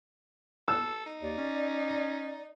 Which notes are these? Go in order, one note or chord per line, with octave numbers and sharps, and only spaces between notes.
A4 E6
D#4
D#2 D5
C#4